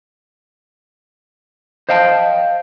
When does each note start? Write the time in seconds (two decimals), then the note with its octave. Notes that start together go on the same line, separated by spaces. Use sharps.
1.89 C5 D#5 F5 G5 A5